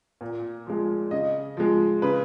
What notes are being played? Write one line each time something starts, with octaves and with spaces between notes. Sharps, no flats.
A#2
F3 G#3
C#3 D#5
F3 G#3
C#3 B4